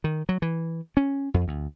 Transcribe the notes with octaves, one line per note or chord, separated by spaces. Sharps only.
D#3
F#3
E3
C#4
F2
D2